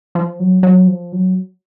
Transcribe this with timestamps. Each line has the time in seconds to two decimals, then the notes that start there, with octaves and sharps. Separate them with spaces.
0.15 F3
0.40 F#3
0.63 F#3
0.87 F3
1.12 F#3